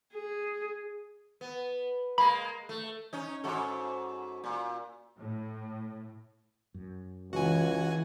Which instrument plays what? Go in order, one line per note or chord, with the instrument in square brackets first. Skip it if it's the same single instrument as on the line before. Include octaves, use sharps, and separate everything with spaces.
[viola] G#4
[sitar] B3
[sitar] G#3 A#3 [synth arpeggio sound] B5
[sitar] A3
C#4 D#4
G#2 F#4 A4
A#2
[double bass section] A2
[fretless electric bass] F#2
[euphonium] C#2 [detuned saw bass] E3 [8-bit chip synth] F#4 G#5